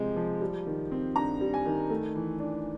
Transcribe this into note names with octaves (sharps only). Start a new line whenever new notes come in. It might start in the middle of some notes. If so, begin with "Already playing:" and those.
Already playing: C3 F3 G#3 C4
F3
G3
D#3
C4
G2 A#5
G3
G#5
D#3
A3
E3
D4